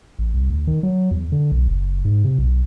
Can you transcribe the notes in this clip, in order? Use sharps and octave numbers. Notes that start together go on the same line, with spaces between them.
A1
C2
D2
D#3
F#3
E2
D3
B1
F#1
G#2
C3
B1